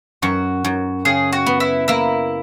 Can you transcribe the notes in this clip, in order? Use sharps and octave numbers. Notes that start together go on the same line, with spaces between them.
F#2 F#4
F#2
C#3 G#4
F#4
B3
E4
A#3 E4